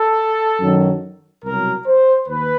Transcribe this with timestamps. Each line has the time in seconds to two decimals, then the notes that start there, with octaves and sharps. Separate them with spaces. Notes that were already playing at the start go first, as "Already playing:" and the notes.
Already playing: A4
0.61 F#2 D#3 F#3
1.44 C2 B2 F#3 A#4
1.86 C5
2.28 D#2 B4